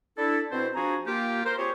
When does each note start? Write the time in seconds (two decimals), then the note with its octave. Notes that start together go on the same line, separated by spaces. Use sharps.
0.18 D4 E4 A4
0.52 B2 C4 E4 C5
0.75 F3 D4 F#4 G#4 G#5 A#5
1.06 A#3 F4 G4
1.45 A#4 C5
1.58 C4 F4 G4 G#4 C#5